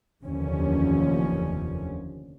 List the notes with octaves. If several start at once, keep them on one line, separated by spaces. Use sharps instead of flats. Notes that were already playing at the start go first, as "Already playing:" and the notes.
F1 D#2 D3 E3 F3 C#4